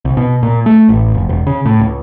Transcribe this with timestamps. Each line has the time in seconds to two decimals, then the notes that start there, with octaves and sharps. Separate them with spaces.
0.05 C2
0.17 B2
0.43 A#2
0.66 A3
0.89 A1
1.14 F1
1.29 E1
1.47 C#3
1.65 A2
1.80 C#2